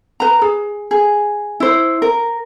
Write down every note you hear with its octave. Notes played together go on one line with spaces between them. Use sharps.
B4 A#5
G#4
G#4
E4 C5
A#4